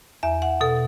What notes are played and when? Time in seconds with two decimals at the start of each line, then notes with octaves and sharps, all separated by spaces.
0.23 E2 E5
0.42 F#5
0.61 B2 A4